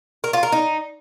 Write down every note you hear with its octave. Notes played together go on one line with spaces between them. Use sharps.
A#4
F4
A#4
D#4